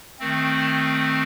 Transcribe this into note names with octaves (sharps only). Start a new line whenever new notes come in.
D#3 A3 C4